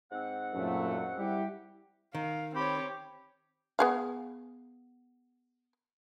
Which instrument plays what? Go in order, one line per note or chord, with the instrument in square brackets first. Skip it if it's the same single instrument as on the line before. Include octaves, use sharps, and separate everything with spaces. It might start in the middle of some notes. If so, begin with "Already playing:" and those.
[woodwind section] G#2 C4 F#5
[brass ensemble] F#2 A#2 A3
G3 E4 G4
[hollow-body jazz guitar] D#3 [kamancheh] F5
[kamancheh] C4 C#5 [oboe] G4 [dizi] B5
[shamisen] B3 G#4 F5